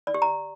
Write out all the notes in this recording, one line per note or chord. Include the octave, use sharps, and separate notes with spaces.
D5
G4
A#5